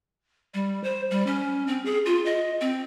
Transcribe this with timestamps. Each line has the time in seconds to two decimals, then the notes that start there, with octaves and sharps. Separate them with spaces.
0.54 G3
0.84 C5
1.11 G3
1.27 C#4
1.67 C4
1.85 G#4
2.06 F4
2.26 D#5
2.61 C4